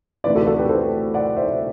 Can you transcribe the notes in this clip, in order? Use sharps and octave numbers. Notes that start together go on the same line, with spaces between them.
D2 C3 E3 B4 D5
F#4 A4
F#4 A4
G4 B4
A4 C5
D5 F#5
C5 E5